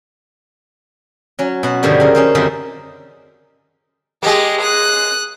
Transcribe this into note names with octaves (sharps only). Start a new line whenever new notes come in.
F#3 C#4
B2 F#5
G2 B2 D3 D#3 F3 G3
C#3 A#4
C#4 D#4 C5
F#2 D3 D#3 G3 C4
G#3 A#3 G4 D#5
D#6 F#6